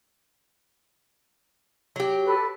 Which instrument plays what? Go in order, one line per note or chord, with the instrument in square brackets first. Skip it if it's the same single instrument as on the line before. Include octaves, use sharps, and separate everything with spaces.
[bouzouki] F#3 G4
[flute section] A4 B4